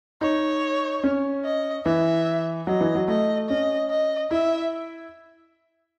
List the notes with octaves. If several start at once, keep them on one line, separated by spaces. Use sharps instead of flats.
D#4 C#5
C#4
D#5
E3 E5
F#3 D#5
E3
F#3
A3 D#5
C#4 D#5
D#5
E4 E5